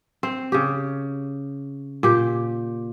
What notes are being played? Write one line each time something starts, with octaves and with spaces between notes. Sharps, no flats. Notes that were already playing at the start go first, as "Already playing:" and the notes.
C4
C#3 G4
A#2 G4